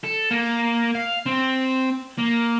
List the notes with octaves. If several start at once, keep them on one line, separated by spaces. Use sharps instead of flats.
A4
A#3
F5
C4
A#3